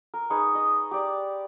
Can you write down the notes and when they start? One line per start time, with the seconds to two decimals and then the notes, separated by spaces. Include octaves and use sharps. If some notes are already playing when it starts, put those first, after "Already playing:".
0.14 A#4
0.30 D#4 G#4 B4 C#6
0.55 D#5
0.91 G4 D5